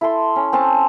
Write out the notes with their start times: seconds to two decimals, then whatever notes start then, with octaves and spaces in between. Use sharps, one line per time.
0.01 E4 A4 C6
0.36 C#4
0.53 C4 C#4 C5 A5